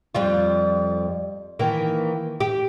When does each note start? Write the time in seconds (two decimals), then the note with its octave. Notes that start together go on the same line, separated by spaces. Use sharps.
0.15 F2 G3 F4
1.59 D#3 E3 A#3
2.40 G4